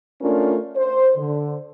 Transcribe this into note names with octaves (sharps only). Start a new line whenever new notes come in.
A3 C#4 D4 F4 A#4
C5
D3